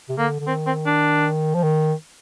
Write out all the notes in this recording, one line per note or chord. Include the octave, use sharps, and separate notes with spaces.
C3
D3 A#3
D3
D#3 C4
C4
D4
F3
D#3